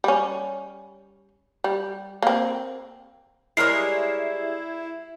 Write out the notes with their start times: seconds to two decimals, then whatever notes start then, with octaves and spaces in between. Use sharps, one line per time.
0.04 G3 C#4
1.64 G3
2.22 A#3 C4
3.57 G3 G#3 E4 G#4 A#4 C#5 C7